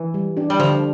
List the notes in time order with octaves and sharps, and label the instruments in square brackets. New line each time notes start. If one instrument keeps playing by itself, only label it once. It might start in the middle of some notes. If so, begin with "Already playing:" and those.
Already playing: [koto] E3
[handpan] G3
D4 G4
[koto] G3
[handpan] D3 [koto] F3